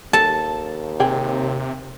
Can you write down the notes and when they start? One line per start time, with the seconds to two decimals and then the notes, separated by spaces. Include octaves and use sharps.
0.13 D#2 A4 A5
1.00 C3 G#4 G5